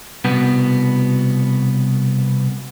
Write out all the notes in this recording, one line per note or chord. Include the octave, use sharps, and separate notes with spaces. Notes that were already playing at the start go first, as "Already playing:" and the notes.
C2 B2 B3